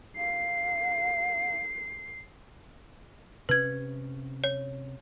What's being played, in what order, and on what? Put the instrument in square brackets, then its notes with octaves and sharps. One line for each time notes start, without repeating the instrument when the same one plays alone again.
[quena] F5 [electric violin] C7
[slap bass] C3 C#4 [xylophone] B4 G#6
[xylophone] C#5